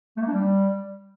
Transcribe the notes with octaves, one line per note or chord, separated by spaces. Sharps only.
A3
A#3
D4
G3